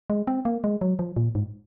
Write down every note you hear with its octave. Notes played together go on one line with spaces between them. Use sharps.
G#3
C4
A#3
G#3
F#3
F3
A#2
G#2